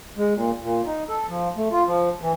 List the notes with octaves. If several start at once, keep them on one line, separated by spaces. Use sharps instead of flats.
G#3
A#2
A#2
D#4
A4
F3
A3
F4
F3
E3